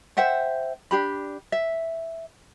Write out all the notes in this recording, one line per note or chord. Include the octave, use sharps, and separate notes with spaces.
C5 E5 F#5 G5
D4 G4 B5
E5